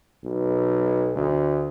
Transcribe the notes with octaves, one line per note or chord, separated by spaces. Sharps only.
B1
D2